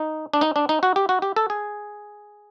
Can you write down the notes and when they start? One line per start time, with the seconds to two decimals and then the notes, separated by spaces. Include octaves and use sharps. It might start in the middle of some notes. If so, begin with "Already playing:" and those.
Already playing: D#4
0.33 D4
0.41 D#4
0.56 D4
0.69 D#4
0.83 F#4
0.96 G4
1.09 F#4
1.22 G4
1.36 A4
1.50 G#4